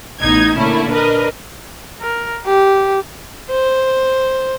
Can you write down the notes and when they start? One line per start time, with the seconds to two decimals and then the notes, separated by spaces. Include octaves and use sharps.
0.21 A1 B3 D#4 G#6
0.56 A#2 D3 A3 A#3 C#4 E4
0.89 D4 A#4 B4 D#5
2.01 A#4
2.46 G4
3.50 C5